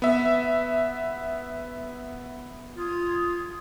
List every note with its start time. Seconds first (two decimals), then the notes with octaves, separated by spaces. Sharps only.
0.02 B3 E5
2.77 F4 C6 D#6 G#6